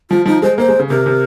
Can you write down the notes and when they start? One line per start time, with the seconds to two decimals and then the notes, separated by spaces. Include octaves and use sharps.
0.10 F3 F4
0.26 F3 D#4
0.42 G#3 C5
0.58 A#3 C5
0.68 G#3
0.79 C#3
0.89 C3 A#4
1.06 C3